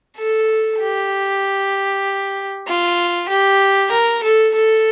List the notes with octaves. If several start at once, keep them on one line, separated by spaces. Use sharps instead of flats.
A4
G4
F4
G4
A#4
A4
A4